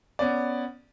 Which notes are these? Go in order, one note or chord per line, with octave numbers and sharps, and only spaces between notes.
B3 C#4 D5